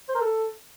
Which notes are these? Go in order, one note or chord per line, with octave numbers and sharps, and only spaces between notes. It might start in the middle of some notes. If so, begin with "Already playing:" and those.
C5
A#4
A4